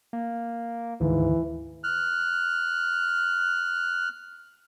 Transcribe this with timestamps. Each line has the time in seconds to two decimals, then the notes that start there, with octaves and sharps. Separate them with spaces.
0.13 A#3
1.01 D2 G#2 D#3 E3
1.84 F6 F#6